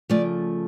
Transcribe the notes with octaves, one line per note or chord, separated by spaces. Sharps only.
C#3 F3 A3 D5